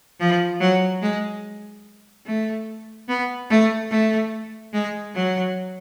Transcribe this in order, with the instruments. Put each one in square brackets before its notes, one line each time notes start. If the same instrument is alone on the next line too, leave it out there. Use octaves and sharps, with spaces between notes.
[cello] F3
F#3
G#3
A3
B3
A3
A3
G#3
F#3